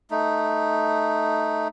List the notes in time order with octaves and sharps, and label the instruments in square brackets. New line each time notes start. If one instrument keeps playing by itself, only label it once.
[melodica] A3 D#4